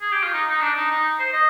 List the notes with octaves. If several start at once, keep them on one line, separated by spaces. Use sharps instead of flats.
G#4
G4
F4
D#4
D#4
D4
D#4
D#4
C5
D#5